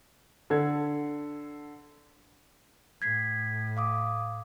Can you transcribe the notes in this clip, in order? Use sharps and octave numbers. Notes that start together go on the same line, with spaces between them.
D3 A4 G#6
A2 G#6 B6 C7
F5 D6 D#6